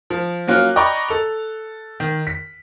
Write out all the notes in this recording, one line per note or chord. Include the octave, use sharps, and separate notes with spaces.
F3
F#3 A#3 C#4 F4 F#6
D5 D#5 G5 A#5 B5 C#6
A4 F7
D#3
B6